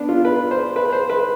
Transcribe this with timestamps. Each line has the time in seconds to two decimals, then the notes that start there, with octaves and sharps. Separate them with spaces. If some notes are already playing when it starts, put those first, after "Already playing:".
Already playing: B3 D4
0.09 F4
0.25 B4
0.51 C5
0.76 B4
0.92 C5
1.10 B4